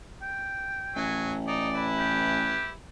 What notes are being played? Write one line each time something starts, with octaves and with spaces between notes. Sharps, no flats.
G5
A1 F#3 G#5
D#4 D5
E4 B4
G4